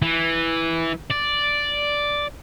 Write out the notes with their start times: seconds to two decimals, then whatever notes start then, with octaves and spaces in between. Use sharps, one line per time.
0.02 E3
1.11 D5